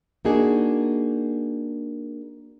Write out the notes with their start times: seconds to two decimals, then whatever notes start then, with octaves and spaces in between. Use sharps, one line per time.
0.25 A#3 D4 D#4 F#4 G#4